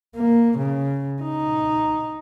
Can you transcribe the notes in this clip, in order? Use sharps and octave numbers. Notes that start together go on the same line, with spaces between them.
A#3
C#3
D#4